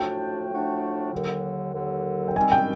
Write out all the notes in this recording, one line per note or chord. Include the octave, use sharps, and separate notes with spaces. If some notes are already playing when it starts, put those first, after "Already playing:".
Already playing: A2 F3 A3 D4 F#4 G5
A2 F3 A3 D4 F#4
D#2 D3 F#3
D#2 D3 F#3
G5
D#3 G3 C4 G#5
G5